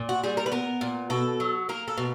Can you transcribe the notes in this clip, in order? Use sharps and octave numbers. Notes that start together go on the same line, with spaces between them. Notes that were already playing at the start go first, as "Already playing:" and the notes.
Already playing: A#2
F#4
G3 G#4
A#4
B4
B3 A#4
A#2
B2 A4
F#3
A#3 A#4
A4
B2